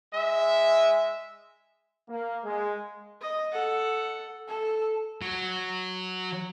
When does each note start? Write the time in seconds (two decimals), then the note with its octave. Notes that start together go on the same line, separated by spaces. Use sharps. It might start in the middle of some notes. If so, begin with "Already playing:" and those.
0.14 G#3 E5
2.09 A#3
2.45 G#3
3.21 D#5
3.52 A4 F#5
4.49 A4
5.22 F#3